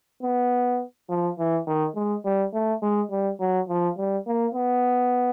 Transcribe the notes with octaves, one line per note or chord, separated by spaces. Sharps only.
B3
F3
E3
D#3
G#3
G3
A3
G#3
G3
F#3
F3
G3
A#3
B3